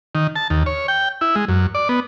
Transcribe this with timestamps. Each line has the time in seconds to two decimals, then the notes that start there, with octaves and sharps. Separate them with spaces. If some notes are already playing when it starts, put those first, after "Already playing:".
0.15 D#3
0.36 A5
0.50 D#2
0.66 C#5
0.88 G5
1.21 E4
1.36 G#3
1.49 F#2
1.75 D5
1.89 B3